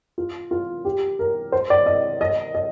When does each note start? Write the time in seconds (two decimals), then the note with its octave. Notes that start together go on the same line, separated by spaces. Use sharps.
0.18 F4
0.51 F4
0.85 G4
1.19 A#4
1.52 C5
1.70 D5
1.86 D#5
2.21 D#5
2.55 D#5